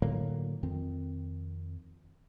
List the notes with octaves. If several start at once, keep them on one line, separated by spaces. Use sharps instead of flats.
A2 D3 F#3 A#3
F2 D#3 C4